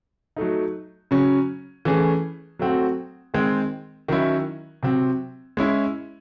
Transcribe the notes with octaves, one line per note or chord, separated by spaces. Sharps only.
F#3 A3 D#4
C#3 F#3 C#4
E3 A3 C#4 G#4
F#3 A3 C4 F#4
D#3 G#3 C4
D#3 F#3 C#4 E4
C3 F#3 C4
G#3 C#4 E4